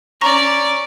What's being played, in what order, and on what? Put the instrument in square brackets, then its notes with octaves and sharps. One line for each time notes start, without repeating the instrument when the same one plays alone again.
[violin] C#4 D5 [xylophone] A#5 C#6 A#6